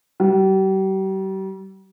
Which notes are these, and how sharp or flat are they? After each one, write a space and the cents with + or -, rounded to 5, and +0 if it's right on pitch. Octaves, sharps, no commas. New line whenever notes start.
G3 -40